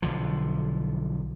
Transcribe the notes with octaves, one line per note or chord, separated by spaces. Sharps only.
B1 D3 F3